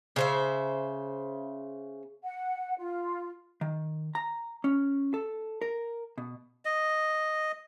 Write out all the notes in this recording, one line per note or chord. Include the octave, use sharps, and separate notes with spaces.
C#3 C5 E5
F#5
F4
D#3
A#5
C#4
A4
A#4
B2
D#5